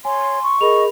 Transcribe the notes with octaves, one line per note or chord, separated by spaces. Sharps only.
C#5 G#5 C6
C#6
G#4 A#4 D#5 B5 F7